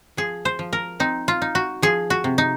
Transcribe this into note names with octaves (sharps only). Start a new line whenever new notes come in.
F3 G#4
C5
F3
A#4
C4 D#4
F4
D#4
F#4
F3 G#4
F#4
C3
D#4